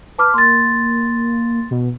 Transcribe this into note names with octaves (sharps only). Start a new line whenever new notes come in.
B4 A5 D6 F6
A#3 C6 A6
B2